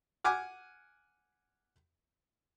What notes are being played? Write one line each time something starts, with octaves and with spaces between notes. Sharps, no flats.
F#5 G#5 D6 F6